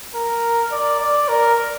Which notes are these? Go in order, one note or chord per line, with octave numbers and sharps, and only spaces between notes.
A#4
D5
D5
A#4